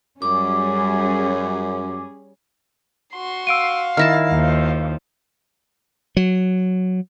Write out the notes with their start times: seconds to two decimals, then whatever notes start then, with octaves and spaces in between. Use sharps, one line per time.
0.22 F#2 G3 C#4 G#4 D6
3.15 F#4 C6
3.47 F5 E6 D7 D#7
3.97 D#3 E4 A5 F6 A#6
4.32 D#2 F3
6.17 F#3